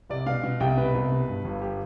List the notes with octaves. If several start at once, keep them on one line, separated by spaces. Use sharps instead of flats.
C2 D5
B2 F5
B2
C2 G5
B2 B4
C2
B2
G2
G1
G4